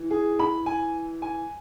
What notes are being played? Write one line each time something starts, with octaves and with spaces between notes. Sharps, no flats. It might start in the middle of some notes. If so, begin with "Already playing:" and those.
Already playing: E3
G#4
B5
G#5
G#5